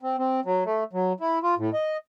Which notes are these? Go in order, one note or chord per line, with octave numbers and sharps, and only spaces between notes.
C4
C4
F#3
A3
F#3
E4
F4
A2
D#5